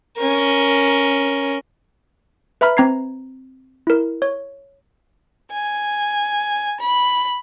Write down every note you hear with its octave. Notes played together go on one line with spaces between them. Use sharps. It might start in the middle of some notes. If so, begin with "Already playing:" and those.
C#4 A#4
B4 E5 A#5 B5 F6
C4 A#5 G#6 C7
E4 A#4
C#5
G#5
B5